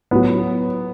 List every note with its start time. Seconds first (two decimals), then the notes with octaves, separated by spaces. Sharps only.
0.11 A2 F#3 B3